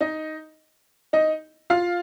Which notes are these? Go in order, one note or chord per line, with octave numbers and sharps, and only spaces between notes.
D#4 D#5
D#4 D#5
F4 F5